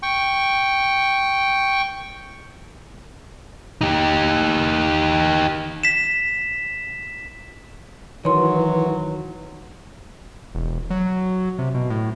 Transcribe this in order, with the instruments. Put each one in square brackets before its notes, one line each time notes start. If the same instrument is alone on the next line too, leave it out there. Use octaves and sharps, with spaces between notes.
[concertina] G5 C#6
[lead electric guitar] D#4 G4
[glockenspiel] B6 E7
[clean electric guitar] D#3 [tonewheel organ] E3 [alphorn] F#3 [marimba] C#5 C6
[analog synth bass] E1
F#3
C3
B2
A2